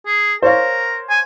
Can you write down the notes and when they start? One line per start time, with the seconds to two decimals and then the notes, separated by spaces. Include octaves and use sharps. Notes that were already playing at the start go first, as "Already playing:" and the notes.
0.06 G#4
0.42 A#4 C5 C#5 F5
1.10 G#5